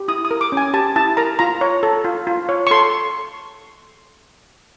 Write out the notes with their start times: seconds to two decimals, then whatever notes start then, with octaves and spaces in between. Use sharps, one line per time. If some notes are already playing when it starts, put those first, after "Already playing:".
Already playing: G4
0.08 E4 D#6
0.25 D#6
0.31 A#4
0.41 D6
0.52 C#4 G#5
0.74 G4 A5
0.96 E4 A5
1.17 A#4 A#5
1.39 F4 A#5
1.61 C#5
1.83 A4
2.05 F4
2.27 F4
2.49 C#5
2.67 C#6
2.71 A4 C6